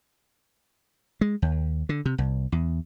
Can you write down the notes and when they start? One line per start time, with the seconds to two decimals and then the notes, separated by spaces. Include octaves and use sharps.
1.21 G#3
1.42 D#2
1.89 D3
2.06 C3
2.18 C2
2.52 E2